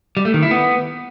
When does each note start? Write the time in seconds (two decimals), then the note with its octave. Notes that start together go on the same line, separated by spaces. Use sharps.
0.17 G3
0.25 A3
0.34 D#3
0.43 E4
0.51 B3